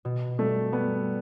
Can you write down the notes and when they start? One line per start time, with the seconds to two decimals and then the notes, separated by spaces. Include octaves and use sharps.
0.05 B2
0.38 G3 A3
0.72 G3 B3